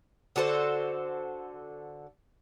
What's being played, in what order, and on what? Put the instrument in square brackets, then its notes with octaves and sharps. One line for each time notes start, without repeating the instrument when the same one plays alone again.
[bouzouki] D3 F#4 A4 C5